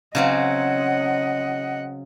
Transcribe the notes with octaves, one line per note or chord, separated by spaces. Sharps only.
C#3 F#3 C4 D#5 F#5